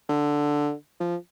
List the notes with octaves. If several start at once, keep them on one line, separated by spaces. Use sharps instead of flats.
D3
F3